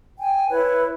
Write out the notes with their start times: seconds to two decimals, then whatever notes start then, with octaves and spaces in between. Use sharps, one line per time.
0.19 G5 G#5
0.49 E4 B4 C#5